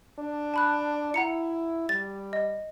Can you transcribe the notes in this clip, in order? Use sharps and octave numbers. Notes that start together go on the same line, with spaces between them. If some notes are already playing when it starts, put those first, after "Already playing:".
D4
A5 B5 F#6
E4 F#5 A#5 C#7
G3 A6
D#5